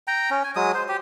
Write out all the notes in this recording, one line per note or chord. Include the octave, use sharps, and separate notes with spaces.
G5 A#5
C#4
G#5
F#3 G#3 D#6
C5
G4